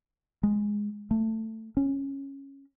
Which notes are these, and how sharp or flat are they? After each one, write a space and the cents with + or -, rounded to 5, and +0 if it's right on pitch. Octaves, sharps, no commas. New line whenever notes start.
G#3 -5
A3 +15
C#4 -10